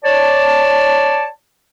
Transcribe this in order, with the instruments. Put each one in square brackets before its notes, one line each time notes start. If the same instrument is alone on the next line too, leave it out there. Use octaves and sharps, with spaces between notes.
[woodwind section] C#5 D5 A5